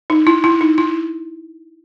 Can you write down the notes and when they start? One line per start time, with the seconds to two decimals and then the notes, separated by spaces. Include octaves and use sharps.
0.10 D#4
0.27 E4
0.44 E4
0.61 D#4
0.78 E4